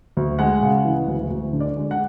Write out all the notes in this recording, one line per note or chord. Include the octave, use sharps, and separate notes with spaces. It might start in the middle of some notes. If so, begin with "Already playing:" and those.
D2
G#3 F#5
C#3
E3
D2
D2
D3
D5
G#3
F#5